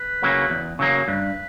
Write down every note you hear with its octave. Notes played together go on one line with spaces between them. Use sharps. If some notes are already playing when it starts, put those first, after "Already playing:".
Already playing: B4
C#3 F#3 A#3
E2
C#3 F#3 A#3
G2 B4